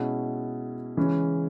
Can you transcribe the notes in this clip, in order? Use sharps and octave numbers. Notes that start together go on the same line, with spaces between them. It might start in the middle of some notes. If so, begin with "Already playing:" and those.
Already playing: B2 G#3 C#4 E4
C#3 E3 G#3 C#4